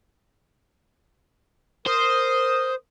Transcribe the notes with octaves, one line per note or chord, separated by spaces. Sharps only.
A#4 C5 D#6